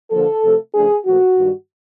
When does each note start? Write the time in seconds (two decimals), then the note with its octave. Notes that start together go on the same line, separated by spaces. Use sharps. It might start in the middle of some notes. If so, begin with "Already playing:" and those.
0.11 D3 F3 A#3 A4
0.42 C3 F3 A3
0.74 C#3 F3 A3 D4 G#4
1.06 A#2 F3 A3 F#4
1.37 G2 D#3 G3